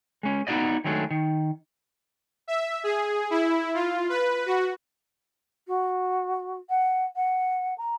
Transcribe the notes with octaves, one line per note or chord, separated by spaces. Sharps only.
G#3 C#4
B3 D#4 E4 F#4 D5 D#5
D#3 F#3 G#3 A3 D4
D#3
E5
G#4
E4
F4
B4
F#4
F#4
F#5
F#5
A#5